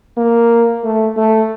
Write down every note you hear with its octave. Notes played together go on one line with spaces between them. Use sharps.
A#3
A3
A3